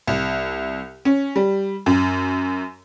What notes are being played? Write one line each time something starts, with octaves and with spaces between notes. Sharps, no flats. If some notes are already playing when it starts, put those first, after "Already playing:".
C2
C#4
G3
F#2